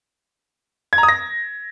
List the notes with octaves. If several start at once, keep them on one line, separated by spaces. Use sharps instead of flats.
G#6
A#5
D#6
A#6